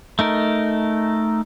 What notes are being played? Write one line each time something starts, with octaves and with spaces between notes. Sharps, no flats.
A3 D#4 A#4